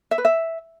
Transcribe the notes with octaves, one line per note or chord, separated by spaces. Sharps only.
E5
B4
E5